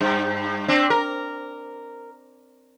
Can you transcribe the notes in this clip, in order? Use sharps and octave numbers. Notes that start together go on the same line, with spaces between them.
G2
C4 D4
A#4